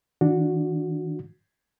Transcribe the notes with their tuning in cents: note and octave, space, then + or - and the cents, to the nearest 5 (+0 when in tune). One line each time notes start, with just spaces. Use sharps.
D#3 +45 D4 +0 F#4 -15